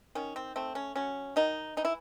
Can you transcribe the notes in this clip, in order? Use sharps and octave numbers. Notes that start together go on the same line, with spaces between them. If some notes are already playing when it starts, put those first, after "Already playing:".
D#3 C#4
C4
A3 C4
C#4
F#3 C#4
D#3 D#4
E3 D#4
E4